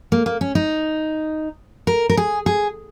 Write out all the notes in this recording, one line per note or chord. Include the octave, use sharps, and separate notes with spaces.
A#3
A#3
C#4
D#4
A#4
A#4
G#4
G#4